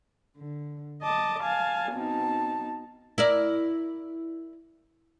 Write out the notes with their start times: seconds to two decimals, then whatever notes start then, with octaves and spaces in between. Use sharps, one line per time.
0.37 D3
1.03 D#5 A5 D6
1.42 F5 G#5 A5
1.93 B2 C4 D#4 A5
3.18 E4 A#4 D5